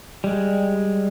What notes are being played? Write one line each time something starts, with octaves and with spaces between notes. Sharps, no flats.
G3 G#3